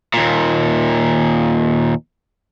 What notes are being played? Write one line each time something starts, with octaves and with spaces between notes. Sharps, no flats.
D#2 A#2